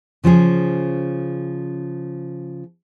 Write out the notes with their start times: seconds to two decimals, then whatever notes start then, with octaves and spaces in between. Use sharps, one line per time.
0.24 C#3 F3 C#4 G#4